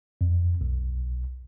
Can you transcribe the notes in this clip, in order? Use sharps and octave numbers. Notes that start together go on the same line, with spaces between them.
F2
B1